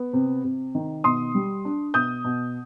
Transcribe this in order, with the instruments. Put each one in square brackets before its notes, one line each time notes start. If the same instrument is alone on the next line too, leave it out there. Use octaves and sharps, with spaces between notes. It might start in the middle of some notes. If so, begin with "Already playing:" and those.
Already playing: [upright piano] B3
C3
C3
D#3
B2 C6 D#6
G3
D4
B2 D#6 G6
B2